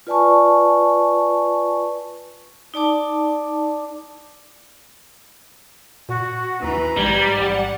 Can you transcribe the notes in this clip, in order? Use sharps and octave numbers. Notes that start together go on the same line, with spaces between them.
F4 B4 D5 G#5 A5 C#6
D#4 D5 A5 D6
A#2 F#4
D#2 E3 B4 A#5
A#1 G#2 G3 G4 G#6
A1 D5 F#5